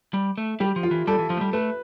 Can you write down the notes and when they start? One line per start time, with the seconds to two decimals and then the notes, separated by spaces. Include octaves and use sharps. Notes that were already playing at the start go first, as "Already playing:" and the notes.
0.14 G3
0.38 A3
0.60 G3 G4
0.76 F3
0.83 F4
0.91 E3
1.07 G3 A4
1.19 E3
1.30 F3
1.37 A3
1.41 G3
1.53 A3 B4